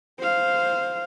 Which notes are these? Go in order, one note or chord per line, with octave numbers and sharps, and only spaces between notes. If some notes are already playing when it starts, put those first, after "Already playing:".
C5 F5